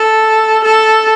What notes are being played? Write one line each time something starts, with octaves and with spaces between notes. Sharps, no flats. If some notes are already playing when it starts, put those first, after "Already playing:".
Already playing: A4
A4